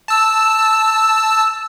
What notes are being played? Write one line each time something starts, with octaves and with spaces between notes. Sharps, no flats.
A5 E6